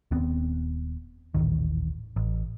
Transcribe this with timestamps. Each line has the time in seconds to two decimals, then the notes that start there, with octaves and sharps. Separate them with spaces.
0.11 D#1 D#2 B3 C4
1.34 D#1 A1 E2 D#3
2.16 A1